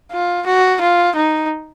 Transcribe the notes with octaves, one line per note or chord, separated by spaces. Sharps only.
F4
F#4
F4
D#4